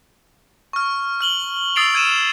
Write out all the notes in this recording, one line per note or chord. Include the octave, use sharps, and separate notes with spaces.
C#6 F6
F6 F#7 G7
D#6 E6 A6 C7 D7 F7
E6 G#6 D#7 E7